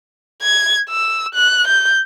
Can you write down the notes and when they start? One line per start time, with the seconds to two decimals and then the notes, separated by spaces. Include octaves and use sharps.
0.42 G#6
0.89 E6
1.34 F#6
1.67 G6